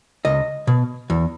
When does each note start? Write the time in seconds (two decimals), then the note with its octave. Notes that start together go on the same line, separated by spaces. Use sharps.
0.25 C#2 D#5
0.67 B2
1.10 E2